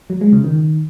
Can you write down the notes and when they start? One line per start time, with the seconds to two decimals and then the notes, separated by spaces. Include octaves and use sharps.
0.10 F#3
0.21 G#3
0.33 C#3
0.44 D#3